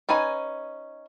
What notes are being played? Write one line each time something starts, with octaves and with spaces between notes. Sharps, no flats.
C#4 D#4 B4 G#5